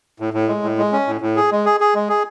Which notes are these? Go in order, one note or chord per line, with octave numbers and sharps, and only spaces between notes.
A2
A2
G#3
A2
G#3
C#4
A2
A2
G#4
G#3
G#4
G#4
G#3
G#4